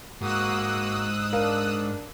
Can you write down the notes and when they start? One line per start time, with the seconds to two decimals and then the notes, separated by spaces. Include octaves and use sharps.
0.21 G#2 A#3 F#4 D#6 E6 F#6
1.33 D4 A#4 F5